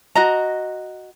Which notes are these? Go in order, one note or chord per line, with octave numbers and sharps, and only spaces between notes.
F#4 D#5 A#5